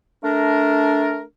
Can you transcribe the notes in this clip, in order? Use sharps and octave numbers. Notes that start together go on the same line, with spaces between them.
A3 D4 A#4